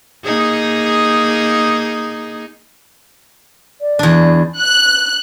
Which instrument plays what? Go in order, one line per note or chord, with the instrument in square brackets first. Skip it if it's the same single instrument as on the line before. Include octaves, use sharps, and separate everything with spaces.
[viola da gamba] A#3 D#4 G#4
[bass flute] D5
[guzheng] E2 D4
[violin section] F#6